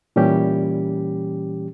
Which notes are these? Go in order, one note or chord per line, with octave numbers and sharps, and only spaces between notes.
A#2 E3 G3 C#4 G4